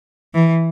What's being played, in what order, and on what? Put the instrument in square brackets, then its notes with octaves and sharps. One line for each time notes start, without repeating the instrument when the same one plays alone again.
[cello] E3